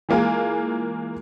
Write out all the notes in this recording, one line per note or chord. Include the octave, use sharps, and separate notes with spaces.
E3 G#3 A#3 F4 G#4